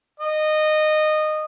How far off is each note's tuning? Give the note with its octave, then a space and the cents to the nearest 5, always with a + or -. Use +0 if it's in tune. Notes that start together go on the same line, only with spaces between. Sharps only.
D#5 -20